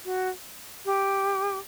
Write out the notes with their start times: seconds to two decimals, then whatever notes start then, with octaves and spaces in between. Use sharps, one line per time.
0.05 F#4
0.85 G4